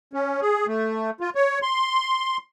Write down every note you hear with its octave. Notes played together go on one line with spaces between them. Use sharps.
C#4
G#4
A3
F4
C#5
C6